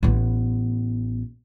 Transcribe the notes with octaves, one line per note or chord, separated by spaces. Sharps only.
A1 B3